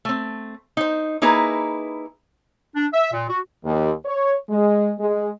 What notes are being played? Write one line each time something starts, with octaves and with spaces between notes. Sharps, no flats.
A3 C4
D#4 C5
A#3 D#4 E4 G#4 B4
D4
E5
A#2
F#4
D#2
C#5
G#3
G#3